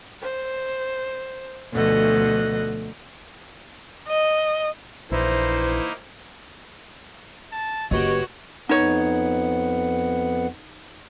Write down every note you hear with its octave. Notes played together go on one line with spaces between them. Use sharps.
C5
D2 B2 F3 A4 D#5 F#6
D#5
A#1 E3 A#3 D#4 E4 C5
A5
F#1 F#4 G4 B4 C#5 D#5
F2 B3 D#4 C#5 F#5